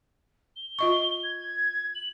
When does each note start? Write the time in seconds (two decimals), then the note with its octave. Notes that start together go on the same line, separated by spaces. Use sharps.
0.55 G7
0.79 F4 D#5 C#6
1.23 G#6
1.94 F#7